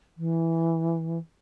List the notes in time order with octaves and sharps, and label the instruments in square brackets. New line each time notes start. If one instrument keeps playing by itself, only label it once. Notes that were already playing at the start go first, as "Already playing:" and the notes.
[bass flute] E3